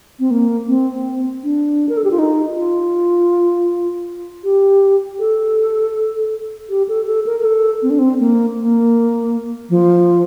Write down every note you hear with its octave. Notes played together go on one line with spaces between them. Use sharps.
C4
A#3
C4
D4
A#4
A4
G4
F4
D#4
F4
G4
A4
G4
A4
A4
A#4
A#4
A4
C4
D4
C4
A#3
A#3
F3